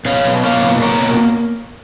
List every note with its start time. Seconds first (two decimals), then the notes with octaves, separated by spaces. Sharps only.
0.05 B2 C#5 F5
0.25 B2
0.43 A#3 C#5 F5
0.62 B2
0.82 A#3 A#4 C#5
1.00 B2